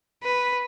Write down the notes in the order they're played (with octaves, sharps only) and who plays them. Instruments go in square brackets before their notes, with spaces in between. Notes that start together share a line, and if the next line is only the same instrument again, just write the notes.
[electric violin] B4